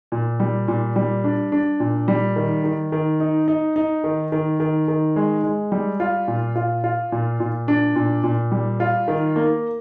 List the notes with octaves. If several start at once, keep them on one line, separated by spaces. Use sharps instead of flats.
A#2
G3
A#2
G3
D4
D4
A#2
G3
D#3
D#3
D#3
D#4
D#4
D#4
D#3
D#3
D#3
D#3
G#3
G#3
G3
F4
A#2
F4
F4
A#2
A#2
D4
A#2
A#2
G3
F4
D#3
A#3